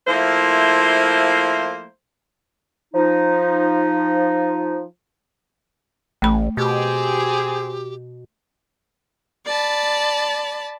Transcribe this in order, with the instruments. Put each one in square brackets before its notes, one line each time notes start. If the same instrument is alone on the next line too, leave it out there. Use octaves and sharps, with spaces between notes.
[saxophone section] F3 A3 A#3 E4 C5
[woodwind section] F3 D#4
[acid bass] A1 [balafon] A3 B5
[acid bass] B2 [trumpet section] C4 G#4 [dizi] G4
[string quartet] D5 A5 B5